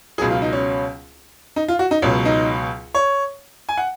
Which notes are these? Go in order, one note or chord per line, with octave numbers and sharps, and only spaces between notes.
C#2 B2 F#3 G#4
F4
D#4
C#4
D#4
F4
F#4
D#4
C#2 B2 F#3 C#4
D#4
C#5
G#5
F#5